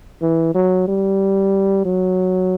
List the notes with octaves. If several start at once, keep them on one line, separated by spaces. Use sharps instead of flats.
E3
F#3
G3
F#3